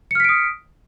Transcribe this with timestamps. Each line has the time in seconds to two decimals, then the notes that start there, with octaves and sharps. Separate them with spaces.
0.11 C#7
0.15 F6
0.20 B6
0.24 D7
0.29 D#6